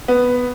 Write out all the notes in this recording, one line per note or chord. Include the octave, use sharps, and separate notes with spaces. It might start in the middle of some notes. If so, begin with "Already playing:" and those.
B3